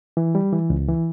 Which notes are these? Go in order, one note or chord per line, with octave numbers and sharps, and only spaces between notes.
E3
G3
E3
C#2
E3